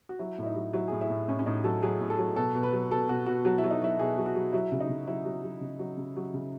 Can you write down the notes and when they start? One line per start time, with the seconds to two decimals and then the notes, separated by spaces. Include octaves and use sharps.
0.09 F#4
0.19 F#3 E4
0.38 A2 E4
0.46 D#4
0.56 F#3
0.73 F#3 E4
0.88 A2 G#4
1.01 E4
1.10 A2
1.28 A2 C#4
1.39 C#4
1.46 A2 D#4
1.64 F#3 A4
1.83 F#3 G#4
2.01 A2
2.10 A4
2.18 F#3
2.36 B2 A4
2.55 B2
2.63 B4
2.73 F#3
2.91 B2 A4
3.09 B2 F#4
3.26 B2 F#4
3.45 F#3 F#4
3.58 E4
3.64 F#3
3.71 D#4
3.82 F#3 E4
3.99 B2 G#4
4.18 F#3
4.26 F#4
4.36 F#3
4.53 F#3 E4
4.72 C#3
4.81 D#4
4.89 C#3
5.07 F#3 E4
5.25 F#3
5.44 F#3
5.61 C#3
5.79 F#3
5.98 C#3
6.17 F#3
6.34 C#3